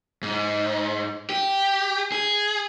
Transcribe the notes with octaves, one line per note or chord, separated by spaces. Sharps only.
G#2
G4
G#4